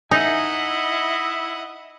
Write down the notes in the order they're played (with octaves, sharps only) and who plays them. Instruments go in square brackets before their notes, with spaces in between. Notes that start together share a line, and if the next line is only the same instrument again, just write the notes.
[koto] D#4 [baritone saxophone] E4 [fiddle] D#5 F#5 [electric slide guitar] E5 G#5